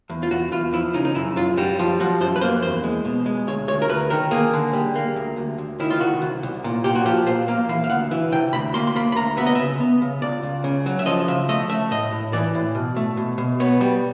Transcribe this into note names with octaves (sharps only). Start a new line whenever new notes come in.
E2
F4
E2 F#4
E2 F4
F3 E4
C#3 D#4
D#4
F#2 E4
F#2 F4
G3 F#4
F3 F4
F3 F#4
F#2 C5
B4
A#3 C5
E2 C5
G#3
B2
G#3
D2 C#5
D2 C#5
A#4
D2 B4
D#3 A#4
A#3 G#4
D3
G3
A#3
D2
D2
D2
D#3 E4
F4
C2 F#4
C2
C2
A#2
A#2 G4
F#4
F3 G4
A#2 C5
A#3 F5
E3 F5
F5
D2 F#5
E3
C3 G5
D2 B5
A#3 C6
C6
A#3 B5
B5
D2 A#5
B3 E5
D#5
C#3 E5
B3
C#3
C#2 D5
C#2
C#3
F#3
E5
F3 D#5
C#3 E5
A3 D#5
A3 E5
A2 D#5
A2
E3 D5
A2
B2
A3
B2
B2
B3 C#5
G3